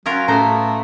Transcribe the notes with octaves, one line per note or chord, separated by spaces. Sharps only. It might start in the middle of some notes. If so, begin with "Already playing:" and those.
F#3 C#4 F4 A#4
A2 A3 B3 C#4 A4 C5 A#5